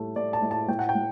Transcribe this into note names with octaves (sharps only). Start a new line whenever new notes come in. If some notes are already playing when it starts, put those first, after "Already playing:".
Already playing: A2 G3 A3
A3 D5
A5
A2
A5
A2 G5
F#5
G5
A2